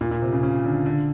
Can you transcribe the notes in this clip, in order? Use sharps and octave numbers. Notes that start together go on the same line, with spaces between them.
A#2
A#2
C3
C#3
C#3
D3
D3